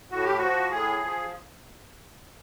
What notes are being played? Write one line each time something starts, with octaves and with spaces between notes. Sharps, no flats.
A2 F#4
G4
F3 F#4
A2 G#4
F3